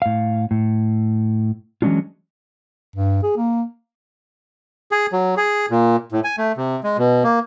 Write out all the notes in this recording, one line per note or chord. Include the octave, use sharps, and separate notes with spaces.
A2 F5
A2
E3 F#3 G#3 C#4 D4 F4
G2
G#4
A#3
G#4
F#3
G#4
A#2
A2
G#5
A3
C3
G#3
B2
A#3